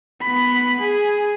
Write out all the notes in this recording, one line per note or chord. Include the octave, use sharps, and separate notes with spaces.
B3 B5
G#4